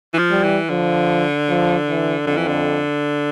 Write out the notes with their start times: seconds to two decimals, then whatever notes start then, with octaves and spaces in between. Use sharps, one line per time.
0.13 E3
0.18 F3
0.31 G3
0.43 E3
0.70 D3 F3
1.49 F3
1.88 E3
2.27 F2 D3
2.37 E3
2.47 D3